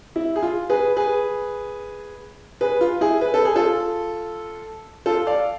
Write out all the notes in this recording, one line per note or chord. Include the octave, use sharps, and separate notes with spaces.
E4
G#4
F4
G#4 B4
G#4 B4
G#4 B4
F4
E4 G#4
B4
A4
G#4
F4 A4
F4 A4
D5 F5